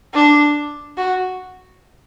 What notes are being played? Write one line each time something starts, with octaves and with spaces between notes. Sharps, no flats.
D4
F#4